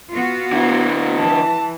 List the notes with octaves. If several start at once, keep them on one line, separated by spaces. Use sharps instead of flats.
B3 F4 F#4
D3 E4
E3 A5